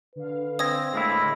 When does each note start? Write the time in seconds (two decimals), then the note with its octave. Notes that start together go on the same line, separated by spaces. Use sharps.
0.16 D3 B4 F5
0.59 C4 D#6 G#6 A#6
0.93 A2 G#3 A#3 E4